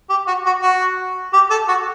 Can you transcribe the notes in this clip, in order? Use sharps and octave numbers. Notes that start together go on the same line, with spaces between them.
G4
F#4
F#4
F#4
G4
A4
F#4